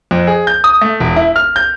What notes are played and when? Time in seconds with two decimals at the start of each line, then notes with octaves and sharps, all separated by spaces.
0.11 F2
0.27 G#4
0.47 G6
0.64 D#6
0.81 A3
1.00 E1
1.16 E4
1.36 F6
1.56 G6